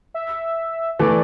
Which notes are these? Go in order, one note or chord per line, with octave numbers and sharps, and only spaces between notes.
E5
E3 A3 D5